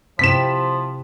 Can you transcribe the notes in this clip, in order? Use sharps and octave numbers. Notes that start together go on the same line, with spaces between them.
C3 F3 C4 E4 C5 B6 E7